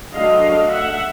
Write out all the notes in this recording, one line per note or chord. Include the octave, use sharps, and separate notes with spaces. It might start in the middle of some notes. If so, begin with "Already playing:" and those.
D3 F#3 A3 D4 D#5 F5
E5 F#5